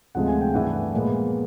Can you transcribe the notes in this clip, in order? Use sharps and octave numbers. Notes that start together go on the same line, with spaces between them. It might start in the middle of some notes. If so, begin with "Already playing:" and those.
D2 C3 F3 G#3 F#5
G#5
G5
G2 E3 A3 F#5
A#2 F3 G#3 B3